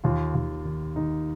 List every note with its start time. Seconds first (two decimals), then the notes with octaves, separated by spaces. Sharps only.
0.04 D#2 F4
0.35 D#2
0.65 D#3
0.96 D#3 D#4